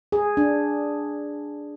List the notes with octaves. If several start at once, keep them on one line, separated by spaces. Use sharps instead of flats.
G#4
D4